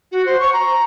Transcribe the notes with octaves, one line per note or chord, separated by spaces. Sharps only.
F#4
C5
C#6
A#5